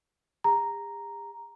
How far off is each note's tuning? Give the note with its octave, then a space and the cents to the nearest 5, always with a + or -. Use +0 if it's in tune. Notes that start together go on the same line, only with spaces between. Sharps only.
G#4 -45 A#5 +0